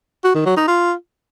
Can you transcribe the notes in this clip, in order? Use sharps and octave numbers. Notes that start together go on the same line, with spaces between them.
F#4
D#3
F#3
D#4
F4